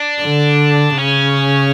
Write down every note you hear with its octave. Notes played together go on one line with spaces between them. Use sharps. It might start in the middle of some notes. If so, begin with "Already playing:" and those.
Already playing: D4
D3
C#3 C#4